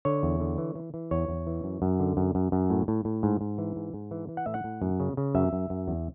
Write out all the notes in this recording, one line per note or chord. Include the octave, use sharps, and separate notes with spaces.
D3 C#5
E2
D3
E3
E3
E3
E2 C#5
E2
E3
F#2
F#2
D3
F#2
F#2
F#2
A2
A2
A2
G#2
G#2
E3
G#2
G#2
E3
E3
F#5
A2 E5
F#5
A2
F#2
C#3
C#3
F#2 E5
F#2
F#2
E2